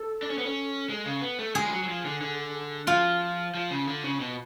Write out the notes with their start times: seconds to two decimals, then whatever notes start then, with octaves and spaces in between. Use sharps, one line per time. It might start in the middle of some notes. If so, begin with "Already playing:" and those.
Already playing: A4
0.23 D4
0.30 C#4
0.38 B3
0.46 C#4
0.90 G#3
1.05 C#3
1.22 B3
1.39 A3
1.55 G#3 G#4
1.64 F3
1.72 F#3
1.83 F#3
1.89 F3
2.05 D3
2.21 D3
2.87 F3 F4
3.55 F3
3.70 C#3
3.88 D3
4.04 C#3
4.20 B2